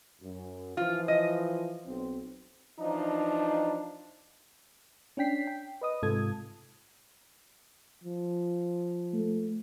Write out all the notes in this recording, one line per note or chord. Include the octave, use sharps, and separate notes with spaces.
F#2
E3 F3 F4
D#5
B1 C4
E3 F3 D4 D#4
C#4 D4 G5 B6 C7
G5
B4 D#5 D#6
G#2 C3 F4 A4 D#6 G#6
F3
A3